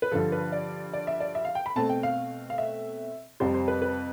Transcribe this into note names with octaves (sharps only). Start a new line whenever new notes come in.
B4
G2 D3 F3 A4
B4
D5
D5
E5
D5
E5
F5
G5
B5
B2 A3 C4 A5
G5
F5
F5
E5
F2 C3 G3 C5
C5
B4
B4